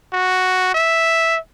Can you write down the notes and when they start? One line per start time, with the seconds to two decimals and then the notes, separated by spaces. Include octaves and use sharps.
0.13 F#4
0.74 E5